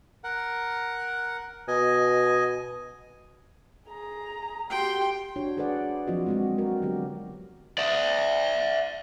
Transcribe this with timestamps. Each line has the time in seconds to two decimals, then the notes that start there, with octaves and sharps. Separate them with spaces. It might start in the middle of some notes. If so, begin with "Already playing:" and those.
0.24 A#4 F#5
1.68 B2 D#5 G#5
3.87 G#4 A#5
4.70 F#4 G4 G5 C6
5.36 D4 F#4 C#5
5.57 G#4 A4 B4 C5 D5 F#5
6.07 F3 F#3 C4 F4 F#4 D#5
6.27 G#3 C4 F#4
6.58 F#4 A#4
6.82 D3 F#3 B3 G4
7.78 D5 E5